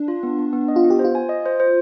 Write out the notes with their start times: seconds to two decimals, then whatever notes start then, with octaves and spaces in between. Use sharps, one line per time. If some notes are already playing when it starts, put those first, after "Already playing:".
Already playing: D4
0.08 F4
0.23 B3
0.39 B3
0.53 B3
0.68 D#5
0.76 F4
0.84 B3
0.90 G4
0.99 C5
1.05 F4
1.15 G#5
1.29 D#5
1.46 C5
1.60 C5